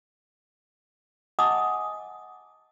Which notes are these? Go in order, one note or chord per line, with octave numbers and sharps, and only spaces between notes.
D#5 F#5 G#5 A5 D6 D#6